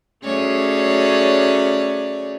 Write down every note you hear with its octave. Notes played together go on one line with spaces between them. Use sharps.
F#3 A3 C#4 G#4 C#5 D5